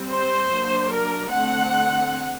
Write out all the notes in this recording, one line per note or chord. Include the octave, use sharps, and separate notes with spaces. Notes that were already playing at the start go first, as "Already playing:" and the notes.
Already playing: G3 C4
C5
F#3 A#3 D4
A#4
D3 A3 C4 F#5